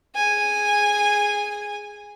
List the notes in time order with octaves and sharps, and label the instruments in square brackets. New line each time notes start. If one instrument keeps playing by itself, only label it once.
[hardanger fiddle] G#4 G#5